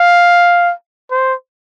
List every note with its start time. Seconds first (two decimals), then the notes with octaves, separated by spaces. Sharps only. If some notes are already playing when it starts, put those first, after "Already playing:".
Already playing: F5
1.11 C5